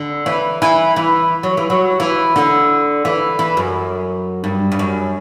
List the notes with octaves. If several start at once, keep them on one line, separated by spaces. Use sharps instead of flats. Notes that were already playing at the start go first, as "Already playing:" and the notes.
Already playing: D3
E3
E3
E3
F#3
E3
F#3
E3
D3
E3
E3
F#2
G2
G2
F#2